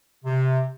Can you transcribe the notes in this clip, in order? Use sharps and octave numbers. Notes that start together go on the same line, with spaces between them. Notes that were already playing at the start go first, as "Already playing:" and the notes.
C3